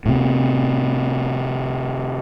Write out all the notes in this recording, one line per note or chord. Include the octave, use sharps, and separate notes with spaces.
A2 C3